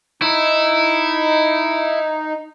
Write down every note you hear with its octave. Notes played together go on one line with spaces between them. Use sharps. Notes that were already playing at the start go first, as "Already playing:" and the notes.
D#4 E4